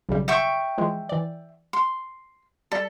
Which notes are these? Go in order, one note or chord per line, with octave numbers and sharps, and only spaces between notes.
B1 C#3 G3
E5 G5 C#6
E3 F3 G#3
E3 D5
C6
G3 A4 B6